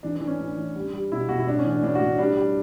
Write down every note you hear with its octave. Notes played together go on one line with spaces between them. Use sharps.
E3 D4
E3 D4
C#4
A2 D4
E3
G3
G3
B2 E4
B2 F#4
E4
A2 D4
C#4
E3
D4
A2 D4
F#4
A2
D4
G3 D4
G3